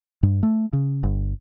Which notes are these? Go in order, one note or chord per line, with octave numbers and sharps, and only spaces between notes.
G2
A3
C#3
G1